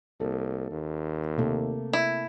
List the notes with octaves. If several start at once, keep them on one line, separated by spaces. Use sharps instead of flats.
C2 A#3 A4
D#2
C3 A3 A#3
E4